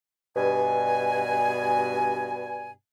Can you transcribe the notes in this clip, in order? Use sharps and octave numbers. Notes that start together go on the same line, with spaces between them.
G2 B2 G#5